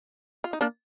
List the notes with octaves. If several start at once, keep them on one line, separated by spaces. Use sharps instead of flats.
F4
D#4
A#3 D4